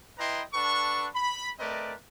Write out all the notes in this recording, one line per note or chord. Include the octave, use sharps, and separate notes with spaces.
E4 B4 D#5 G5 A#5 C6
D4 A4 B4 F#5 C#6
B5
A3 C4 A#4 B4 D5 D#5